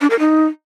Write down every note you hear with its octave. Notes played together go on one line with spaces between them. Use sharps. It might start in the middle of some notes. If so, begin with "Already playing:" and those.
D4
A#4
D#4